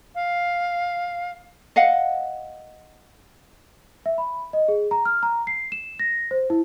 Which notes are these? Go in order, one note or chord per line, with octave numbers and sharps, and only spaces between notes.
F5
D#5 F5 F#5
E5
B5
D#5
G#4
A#5
F6
A#5
C7
E7
A#6
C5
E4